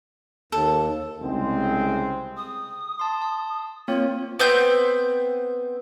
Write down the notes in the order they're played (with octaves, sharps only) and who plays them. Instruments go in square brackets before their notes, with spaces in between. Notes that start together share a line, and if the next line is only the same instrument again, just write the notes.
[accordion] D#2 [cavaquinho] A4
[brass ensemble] C2 C#3 G#3 C4
[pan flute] D#6
[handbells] A5 C6
A5
[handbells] A#3 C4 C#5 [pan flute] F4
[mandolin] B3 C4 G6